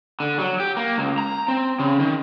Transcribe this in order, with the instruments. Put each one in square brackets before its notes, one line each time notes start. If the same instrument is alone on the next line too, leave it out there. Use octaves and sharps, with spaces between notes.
[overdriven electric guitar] D3
F#3
G4
A#3
C#2
A#5
C4
C#3
D#3